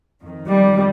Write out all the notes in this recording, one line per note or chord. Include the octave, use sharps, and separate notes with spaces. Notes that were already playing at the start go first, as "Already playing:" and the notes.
F2 D#3
G3